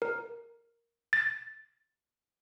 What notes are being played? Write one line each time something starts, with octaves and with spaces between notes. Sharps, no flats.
A#4
A6